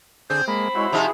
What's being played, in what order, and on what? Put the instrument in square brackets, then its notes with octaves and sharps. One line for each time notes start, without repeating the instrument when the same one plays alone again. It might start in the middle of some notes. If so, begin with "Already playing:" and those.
[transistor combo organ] D3 G#4 [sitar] C4 [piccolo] G6
[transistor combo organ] G#3 A#3 [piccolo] B5
[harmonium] G#3 E4 C#5 [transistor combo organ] F#4 C5 E5
[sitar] C3 F3 D#4 [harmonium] E4 G#4